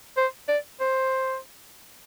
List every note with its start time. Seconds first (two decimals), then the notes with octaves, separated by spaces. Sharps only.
0.17 C5
0.48 D5
0.80 C5